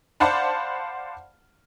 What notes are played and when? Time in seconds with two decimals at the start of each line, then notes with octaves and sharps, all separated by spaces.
0.20 C5 D5 F5 F#5 A5 B5